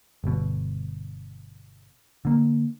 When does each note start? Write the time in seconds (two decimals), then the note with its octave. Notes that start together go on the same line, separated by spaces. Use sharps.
0.24 G1 B2
2.25 D3 A#3